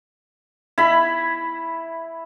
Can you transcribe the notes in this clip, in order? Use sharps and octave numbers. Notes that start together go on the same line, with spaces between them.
E4 B5